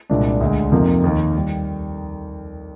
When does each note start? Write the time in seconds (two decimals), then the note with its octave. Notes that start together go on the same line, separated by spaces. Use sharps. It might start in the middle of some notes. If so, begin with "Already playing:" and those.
0.10 C2 A#2 G#3 D4
0.40 D2 D3 G#3
0.72 F2 C3 F3 A#3 D#4
1.04 D#2 D#3 A#3 D#4
1.36 D#3 G3